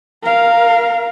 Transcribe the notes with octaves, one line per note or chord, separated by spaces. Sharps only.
A#4 F5